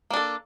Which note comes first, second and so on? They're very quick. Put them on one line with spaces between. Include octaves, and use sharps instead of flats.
A#3 D4 A4